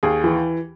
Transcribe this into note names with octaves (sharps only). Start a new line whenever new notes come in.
D#2 G#4
E3